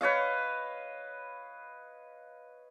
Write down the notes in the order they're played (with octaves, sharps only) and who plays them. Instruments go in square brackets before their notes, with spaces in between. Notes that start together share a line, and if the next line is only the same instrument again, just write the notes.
[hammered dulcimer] B4 C#5 D#5 F5